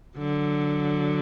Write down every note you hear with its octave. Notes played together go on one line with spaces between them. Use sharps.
D3 F#3